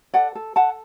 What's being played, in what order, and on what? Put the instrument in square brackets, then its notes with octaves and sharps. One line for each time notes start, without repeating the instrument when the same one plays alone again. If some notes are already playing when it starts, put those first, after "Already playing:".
[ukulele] A4 D5 F#5
A4
A4 F#5 A5